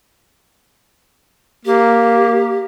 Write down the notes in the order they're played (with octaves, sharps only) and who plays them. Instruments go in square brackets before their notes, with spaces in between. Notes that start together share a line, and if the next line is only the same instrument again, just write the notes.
[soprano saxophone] A#3 [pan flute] G4